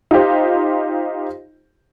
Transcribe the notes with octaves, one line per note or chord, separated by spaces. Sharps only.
D#4 F4 G4 C5